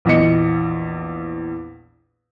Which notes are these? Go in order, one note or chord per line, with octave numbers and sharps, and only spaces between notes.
A#1 E2 D#5 C#7